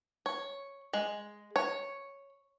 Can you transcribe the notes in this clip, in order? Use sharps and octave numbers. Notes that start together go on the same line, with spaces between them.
C#5
G#3
C#5